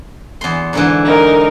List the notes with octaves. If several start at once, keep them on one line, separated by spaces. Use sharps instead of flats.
E2 C6
G#2 D3 E3
D#4 A#4